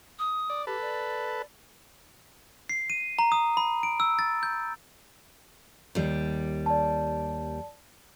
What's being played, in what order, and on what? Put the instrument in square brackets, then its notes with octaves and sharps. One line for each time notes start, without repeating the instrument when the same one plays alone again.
[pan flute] D#6
[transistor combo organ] D5
[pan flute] G4 [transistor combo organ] A4 B4
[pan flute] D5
[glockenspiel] C7
D#7
A#5
D#6
B5
D7
E6
A6
G6
[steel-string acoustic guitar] D#2 G3
[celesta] D5 A5